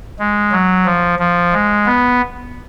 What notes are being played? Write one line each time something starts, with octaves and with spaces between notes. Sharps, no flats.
G#3
F#3
F3
F3
G#3
B3